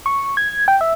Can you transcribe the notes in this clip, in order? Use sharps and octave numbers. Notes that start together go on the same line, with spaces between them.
C#6
G#6
G5
E5